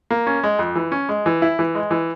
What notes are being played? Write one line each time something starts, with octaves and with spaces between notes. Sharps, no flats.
A#3
C#4
G#3
F2
E3
C#4
G#3
E3
E4
E3
G#3
E3